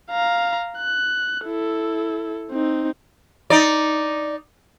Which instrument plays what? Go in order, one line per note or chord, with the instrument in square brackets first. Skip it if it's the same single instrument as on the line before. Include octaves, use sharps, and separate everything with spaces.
[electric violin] F5 A#5
F#6
E4 A4
C4 D#4
[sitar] D#4 D5